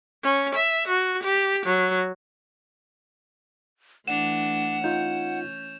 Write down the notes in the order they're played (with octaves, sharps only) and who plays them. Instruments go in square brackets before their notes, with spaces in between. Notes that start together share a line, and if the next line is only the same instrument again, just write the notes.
[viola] C#4
E5
F#4
G4
F#3
[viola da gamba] E3 A3 D4 [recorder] F#5 [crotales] E7 F7
[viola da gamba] C#4 [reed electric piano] D#4 F4 [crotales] G6